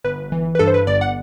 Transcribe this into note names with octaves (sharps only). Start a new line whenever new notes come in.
G1 B4
E3
B4
G2 A4
C5
B4
G1 D5
F#5